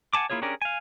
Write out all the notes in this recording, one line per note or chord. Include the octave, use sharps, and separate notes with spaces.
F#5 G#5 A5 D6
A#3 E4 F4 G#4 C#5
C#4 D4 G4 G#4 A#4
F5 G#5